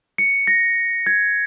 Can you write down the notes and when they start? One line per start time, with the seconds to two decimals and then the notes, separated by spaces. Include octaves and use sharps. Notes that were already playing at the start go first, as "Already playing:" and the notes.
0.18 C#7
0.47 A#6
1.06 G#6